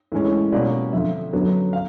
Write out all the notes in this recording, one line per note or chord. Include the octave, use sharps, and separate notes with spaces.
A2 E3 G#3 C#4
B2 G3 A#3 C#4 D5
F2 D3 F3 E5
F#2 D3 F#3 B3
F5